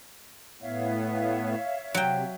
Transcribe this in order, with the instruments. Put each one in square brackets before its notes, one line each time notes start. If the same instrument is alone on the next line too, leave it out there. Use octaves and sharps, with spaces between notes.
[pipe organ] A2 B3 [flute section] C#5 E5 F5
[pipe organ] C3 [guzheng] F#3 G5